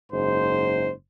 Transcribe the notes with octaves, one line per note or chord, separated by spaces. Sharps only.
F#1 G#2 C5